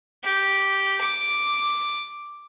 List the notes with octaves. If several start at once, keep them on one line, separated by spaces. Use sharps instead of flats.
G4
D6